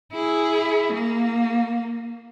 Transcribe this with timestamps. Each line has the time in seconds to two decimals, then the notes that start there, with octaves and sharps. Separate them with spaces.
0.13 E4 G#4
0.93 A#3